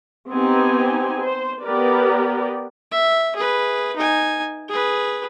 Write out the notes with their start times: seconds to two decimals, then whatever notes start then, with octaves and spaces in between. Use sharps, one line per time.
0.31 B3 C4 D#4 G4 G#5
1.22 C5
1.63 B3 G4 A#4 B4 D5
2.91 E5
3.35 G#4 B4
3.96 D#4 G#5
4.69 G#4 B4